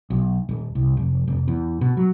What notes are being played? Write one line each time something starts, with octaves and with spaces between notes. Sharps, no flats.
B1
D#1
C2
F1
F1
E2
B2
F#3